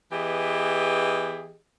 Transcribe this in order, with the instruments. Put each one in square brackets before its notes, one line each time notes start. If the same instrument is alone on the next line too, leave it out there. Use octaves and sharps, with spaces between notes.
[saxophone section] E3 B3 G4 G#4 D#5